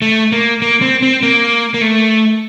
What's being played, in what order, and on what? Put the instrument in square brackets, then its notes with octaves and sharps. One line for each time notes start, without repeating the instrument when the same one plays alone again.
[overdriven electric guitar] A3
A#3
A#3
C4
C4
A#3
A#3
A3